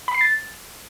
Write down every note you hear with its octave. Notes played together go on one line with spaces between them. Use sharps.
B5
C7
A6